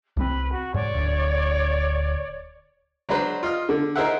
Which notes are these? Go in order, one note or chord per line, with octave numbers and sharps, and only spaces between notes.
C2 G3 C4 B4
F#4
G#2 C#5 D5
D1 D2
F#3 G#3 D4 B4 C5
F4 D#5 F6
D3
D#4 G#4 A#4 C5 E5 F#5